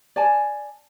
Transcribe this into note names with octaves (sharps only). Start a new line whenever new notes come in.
D5 G#5 A5